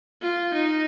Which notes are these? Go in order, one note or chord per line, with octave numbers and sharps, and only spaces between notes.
F4
D#4